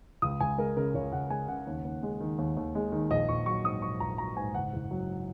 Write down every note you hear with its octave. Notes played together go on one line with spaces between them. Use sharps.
C#2 D#6
C#2 G#5
G#3 A#4
C#3 A#4
C#2 C#5
C#2 F#5
G#3 G#5
C#3 F#5
D#2
D#2
G#3
D#3
D#2
D#2
G#3
D#3
A#1 D#5
A#1 C#6
F#3 C#6
G#2 D#6
A#1 C#6
A#1 A#5
F#3 A#5
G#2 G#5
F#1 F#5
F#1
F#3